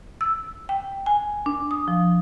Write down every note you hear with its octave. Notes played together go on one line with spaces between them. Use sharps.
E6
G5
G#5
D4
D#6
F3